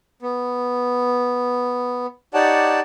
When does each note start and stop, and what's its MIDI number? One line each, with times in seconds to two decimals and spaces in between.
0.22 2.06 59
2.34 2.80 63
2.34 2.80 67
2.34 2.80 73
2.34 2.80 74
2.34 2.80 78
2.34 2.80 81